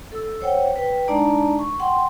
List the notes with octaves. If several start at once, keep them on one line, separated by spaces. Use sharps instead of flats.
A4 E6
C5 C#5 F#5 G5
B4 G5
G#3 D4 D#4 D5 A5 A#5
C#6
F#5 G5 C6